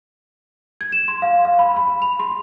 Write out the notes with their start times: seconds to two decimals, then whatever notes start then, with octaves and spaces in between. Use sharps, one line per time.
0.81 G#6
0.92 E7
1.08 C6
1.22 F5
1.45 F5
1.59 B5
1.76 B5
2.02 F7
2.20 C6